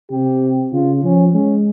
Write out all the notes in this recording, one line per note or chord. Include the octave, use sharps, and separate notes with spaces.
C3 G4
C#3 F4
F3 C#4
G#3 C#4